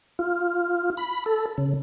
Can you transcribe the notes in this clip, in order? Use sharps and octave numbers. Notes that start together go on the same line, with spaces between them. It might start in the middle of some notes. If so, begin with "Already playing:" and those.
F4
B5
A4
C#3